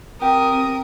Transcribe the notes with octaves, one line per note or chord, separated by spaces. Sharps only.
C4 G4 A#4 D#6